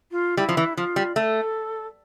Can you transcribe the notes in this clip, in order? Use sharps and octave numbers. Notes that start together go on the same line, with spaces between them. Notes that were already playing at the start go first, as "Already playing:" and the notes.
F4
G3 E4
F3
E3
F3 F4
G3
A3 A4